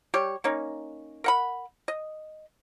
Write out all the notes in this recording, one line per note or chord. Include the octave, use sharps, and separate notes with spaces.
G3 G4 C#5
A#3 C#4 D#4
A#4 F#5 B5
D#5